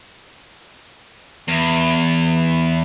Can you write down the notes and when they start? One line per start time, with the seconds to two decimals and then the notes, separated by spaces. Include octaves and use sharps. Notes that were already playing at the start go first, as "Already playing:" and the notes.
1.48 E2